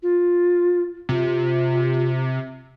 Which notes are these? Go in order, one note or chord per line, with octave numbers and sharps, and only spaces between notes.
F4
C3 F4